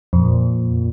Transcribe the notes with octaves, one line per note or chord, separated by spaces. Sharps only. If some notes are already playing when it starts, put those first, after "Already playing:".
F2 A#2